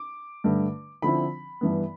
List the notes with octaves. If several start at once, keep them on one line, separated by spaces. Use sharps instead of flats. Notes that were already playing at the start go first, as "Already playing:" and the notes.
Already playing: D6
G2 D3 A3
D3 F3 C4 E4 B5
G2 E3 B3